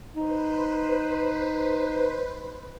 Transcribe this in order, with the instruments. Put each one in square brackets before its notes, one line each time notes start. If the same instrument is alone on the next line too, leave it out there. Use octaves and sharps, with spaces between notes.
[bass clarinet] D#4 [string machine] B4 C5